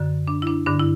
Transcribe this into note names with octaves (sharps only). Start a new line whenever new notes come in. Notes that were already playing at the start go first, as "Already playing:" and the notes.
Already playing: F#2 D3
D4
E4
D4
G2 D3 D4
E4